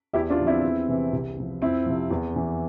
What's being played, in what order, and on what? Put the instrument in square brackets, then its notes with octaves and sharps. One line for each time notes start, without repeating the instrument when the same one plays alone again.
[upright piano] E2 E4 G4
D4 F4
D3 F3
C4 E4
E2
C3 E3
C2
C3 F3
F2 C4 E4
C3 F3
E2
E3